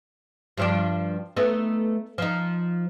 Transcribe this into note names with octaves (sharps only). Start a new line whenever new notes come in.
G2 F3 D4
A3 B3 D#4
F3 D#4